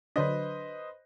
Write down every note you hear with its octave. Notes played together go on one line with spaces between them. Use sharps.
D3 F#3 D4 B4 C5 D#5